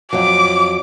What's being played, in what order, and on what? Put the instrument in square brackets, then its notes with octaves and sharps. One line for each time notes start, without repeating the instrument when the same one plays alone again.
[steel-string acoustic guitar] F2 F#3 [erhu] D6